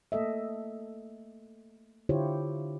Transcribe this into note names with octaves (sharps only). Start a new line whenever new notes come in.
A3 A#3 A4 D#5 E5
D3 E4 F4 G4 C5 C#5